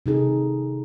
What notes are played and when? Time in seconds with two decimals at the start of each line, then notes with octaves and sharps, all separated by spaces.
0.06 C3 D#4 G#4 A4